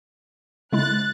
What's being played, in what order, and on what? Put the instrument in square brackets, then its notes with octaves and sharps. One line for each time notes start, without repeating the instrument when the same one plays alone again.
[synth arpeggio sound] C#3 G#3 E4 [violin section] F#6 A6